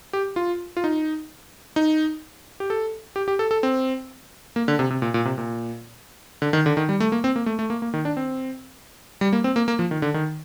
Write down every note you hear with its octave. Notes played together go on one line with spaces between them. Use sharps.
G4
F4
F4
D#4
D#4
G4
A4
G4
G4
A4
A4
C4
A#3
D3
C3
C3
A#2
A#2
C3
A#2
D3
D#3
D3
D#3
G3
A3
A#3
C4
A#3
A3
A3
A#3
A#3
D#3
D4
C4
G3
A#3
C4
A#3
A#3
F3
D#3
D3
D#3